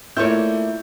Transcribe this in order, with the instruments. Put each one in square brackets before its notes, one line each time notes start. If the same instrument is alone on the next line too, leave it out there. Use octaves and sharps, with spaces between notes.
[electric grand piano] A3 G6 [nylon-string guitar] A#3 D5 E5 [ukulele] E4 F4 C#5